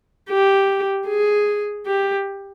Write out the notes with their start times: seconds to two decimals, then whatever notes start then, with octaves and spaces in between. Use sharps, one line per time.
0.29 G4
1.07 G#4
1.86 G4